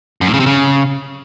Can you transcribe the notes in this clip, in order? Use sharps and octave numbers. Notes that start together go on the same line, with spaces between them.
F#2
A2
C#3
C3
C#3